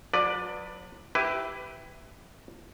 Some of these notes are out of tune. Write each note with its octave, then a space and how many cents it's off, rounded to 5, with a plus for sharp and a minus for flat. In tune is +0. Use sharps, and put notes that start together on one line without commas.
F#3 -40 B4 +0 D5 +10
E4 +0 G4 +0 B4 +20